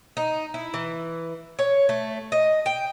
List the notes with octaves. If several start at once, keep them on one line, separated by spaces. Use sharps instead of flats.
D#4
E4
E3
C#5
A3
D#5
G5